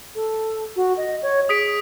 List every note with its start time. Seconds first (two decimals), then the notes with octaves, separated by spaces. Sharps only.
0.15 A4
0.76 F#4
0.97 D#5
1.22 C#5
1.49 G#4 D#6 B6 D7